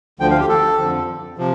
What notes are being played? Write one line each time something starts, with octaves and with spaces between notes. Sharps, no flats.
D2 D3 F3 G5
F5
G4
A4
F2 D3 F3
C3 F3